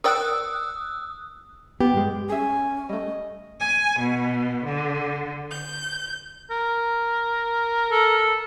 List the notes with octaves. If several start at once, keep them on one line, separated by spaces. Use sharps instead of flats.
A#4 D5 G5 D#6 E6 F#6
B3 G4
G2 G#3
C#4 G#4 E5 G#5
G3 A3 D#5
G#5
B2
D3
G6
A#4
A4